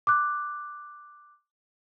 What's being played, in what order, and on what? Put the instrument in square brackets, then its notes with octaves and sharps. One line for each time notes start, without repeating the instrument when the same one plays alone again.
[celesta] D6 F#6